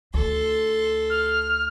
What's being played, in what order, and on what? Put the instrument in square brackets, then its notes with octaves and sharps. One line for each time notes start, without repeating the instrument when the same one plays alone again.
[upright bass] D2 [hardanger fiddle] A4 C6
[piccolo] F6